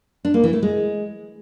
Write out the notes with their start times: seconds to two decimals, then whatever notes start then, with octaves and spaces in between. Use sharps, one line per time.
0.25 D4
0.34 A#3
0.44 E3
0.53 A3
0.63 G#3